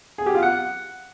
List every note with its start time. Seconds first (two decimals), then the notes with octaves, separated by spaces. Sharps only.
0.18 G#4
0.26 G4
0.34 F4
0.43 F#5